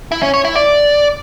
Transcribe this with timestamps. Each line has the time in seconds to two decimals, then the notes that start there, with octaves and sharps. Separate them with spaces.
0.12 E4
0.23 C#4
0.34 C#5
0.45 E4
0.56 D5